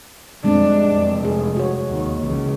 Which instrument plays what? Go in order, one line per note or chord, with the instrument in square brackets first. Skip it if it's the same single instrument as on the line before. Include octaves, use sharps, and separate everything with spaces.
[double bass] F2 D4 [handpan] G3 G#3 C4
[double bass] F1
[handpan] G#4
F#4 C#5
[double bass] D#2
[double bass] C#2 [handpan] E3